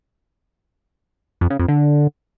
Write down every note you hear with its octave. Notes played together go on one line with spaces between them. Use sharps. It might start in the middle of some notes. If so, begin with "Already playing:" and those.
F2
C#3
F2
D3